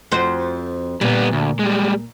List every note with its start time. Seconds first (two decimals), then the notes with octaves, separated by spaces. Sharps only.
0.12 F2 F#4 C5
1.01 A#2 G3 B3
1.32 D2
1.59 G3 G#3